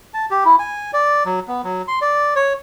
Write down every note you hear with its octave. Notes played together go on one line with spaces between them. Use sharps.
A5
G4
E4
G#5
D5
F#3
B3
F#3
C6
D5
C#5